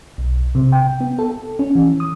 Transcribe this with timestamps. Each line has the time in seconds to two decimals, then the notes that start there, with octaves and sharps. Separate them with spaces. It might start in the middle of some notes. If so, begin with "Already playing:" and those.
0.18 B1
0.55 C3
0.72 G5
1.00 B3
1.19 A4
1.59 C#4
1.75 E3
2.00 D#6